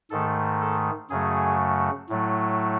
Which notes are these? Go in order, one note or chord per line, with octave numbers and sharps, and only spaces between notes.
G#2 D#3 A3 A4
A4
F#2 C#3 F#3 A3 G#4
A2 F#3 A3